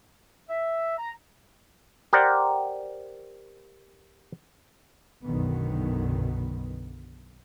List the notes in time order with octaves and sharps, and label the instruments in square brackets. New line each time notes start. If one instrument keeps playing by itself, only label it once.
[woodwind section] E5
A#5
[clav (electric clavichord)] G4 A#4 C5 D5 F#5
[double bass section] B1 F#2 B2 D3 D#3 B3